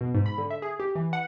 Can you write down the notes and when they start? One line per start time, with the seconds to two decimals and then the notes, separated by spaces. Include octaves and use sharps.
0.01 B2
0.14 G#2
0.26 B5
0.38 D3
0.50 E5
0.62 G#4
0.80 G4
0.95 E3
1.13 F#5